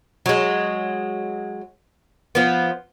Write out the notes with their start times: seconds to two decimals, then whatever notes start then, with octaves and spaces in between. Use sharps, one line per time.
0.26 F#3 G#3
2.35 F3 B3